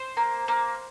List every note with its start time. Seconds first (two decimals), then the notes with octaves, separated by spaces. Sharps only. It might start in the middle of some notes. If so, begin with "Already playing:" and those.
Already playing: C5
0.17 A#3
0.48 A#3